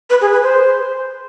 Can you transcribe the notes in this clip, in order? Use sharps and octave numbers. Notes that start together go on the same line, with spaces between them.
B4
G#4
B4
C5